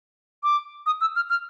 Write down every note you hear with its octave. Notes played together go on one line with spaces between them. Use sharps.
D6
D#6
E6
F6
F6